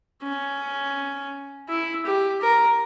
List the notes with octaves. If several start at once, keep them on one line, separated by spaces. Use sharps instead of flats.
C#4
E4
G4
A#4